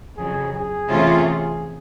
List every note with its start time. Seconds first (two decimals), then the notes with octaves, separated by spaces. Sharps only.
0.16 F2 C#3 F#3 G#4
0.53 G#4
0.89 C3 E3 A3 C#4 F4
1.26 G#4